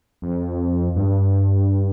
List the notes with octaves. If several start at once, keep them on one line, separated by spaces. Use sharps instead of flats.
F2
G2